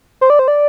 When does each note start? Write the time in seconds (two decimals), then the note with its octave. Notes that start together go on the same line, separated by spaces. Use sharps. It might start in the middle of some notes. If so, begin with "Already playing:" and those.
0.21 C5
0.30 D5
0.39 C5
0.48 D5